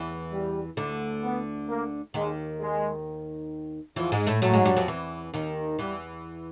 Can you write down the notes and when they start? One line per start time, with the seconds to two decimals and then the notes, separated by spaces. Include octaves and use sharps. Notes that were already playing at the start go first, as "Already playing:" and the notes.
Already playing: E2 E3
0.32 G3
0.77 D2 D3
1.23 B3
1.68 A#3
2.14 D#2 D#3 G#3
2.60 G#3
3.96 E2 E3 F3
4.12 G#2 G#3
4.27 A2 A3
4.42 A2 F#3 A3
4.53 G#2 G#3
4.65 G2 G3
4.77 F2 F3
4.88 E2 E3
5.34 D#2 D#3
5.79 E2 E3 G3